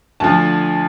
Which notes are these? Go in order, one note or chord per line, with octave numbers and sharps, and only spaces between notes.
D2 D3 F3 A5